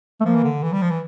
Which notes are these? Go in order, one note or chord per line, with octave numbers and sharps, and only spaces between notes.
A3
F3 A#3
E3
D3
E3
G3
F3
E3